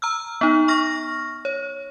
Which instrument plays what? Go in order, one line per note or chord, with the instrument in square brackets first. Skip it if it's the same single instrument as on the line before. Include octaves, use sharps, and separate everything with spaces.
[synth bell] A#5 E6 F6
B3 D#4
C#6 F6 A#6
C#5